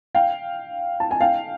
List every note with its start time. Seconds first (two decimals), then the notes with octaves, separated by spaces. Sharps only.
0.15 F5 G5
1.00 A5
1.11 G#5
1.21 F5 G5